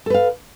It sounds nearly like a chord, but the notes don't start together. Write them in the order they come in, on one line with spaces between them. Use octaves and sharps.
A4 B4 F5